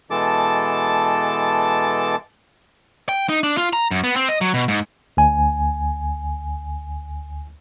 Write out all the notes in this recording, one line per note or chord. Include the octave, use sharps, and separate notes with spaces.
B2 E3 G#3 A4 A5 D6
G5
D#4
D4
F4
A#5
F#2
B3
C4
D#5
F#3
B2
G#2
D2 G#5